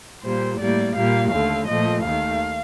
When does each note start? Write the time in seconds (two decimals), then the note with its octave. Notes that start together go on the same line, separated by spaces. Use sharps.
0.23 A#2 G3 A#3 C5
0.60 A2 G3 A#3 D5
0.96 A#2 G3 A#3 F5
1.32 D#2 D3 A3 F5
1.68 A#2 F3 A3 D#5
2.05 D#2 D#3 A3 F5